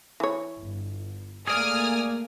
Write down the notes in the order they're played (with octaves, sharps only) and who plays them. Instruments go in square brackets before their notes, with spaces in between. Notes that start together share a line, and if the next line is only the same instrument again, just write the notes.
[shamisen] E3 C#5
[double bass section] G1
[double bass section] A3 A#3 [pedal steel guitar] G#4 D5 [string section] G#5 D#6 F6